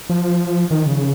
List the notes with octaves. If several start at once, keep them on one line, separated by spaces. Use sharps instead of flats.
F3
D#3
C#3